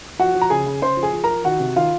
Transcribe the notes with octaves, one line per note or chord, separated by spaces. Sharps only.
F3 F#4 F#5
F3
A#5
C#3 G#4 G#5
C#3
C#3 C5 C6
F3
G#4 G#5
F3
A#4 A#5
F3
D#3 F#4 F#5
C3
D#3 F4 F5